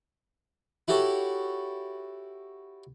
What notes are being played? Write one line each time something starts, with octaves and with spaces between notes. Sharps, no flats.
E4 F#4 G4 A4 C#5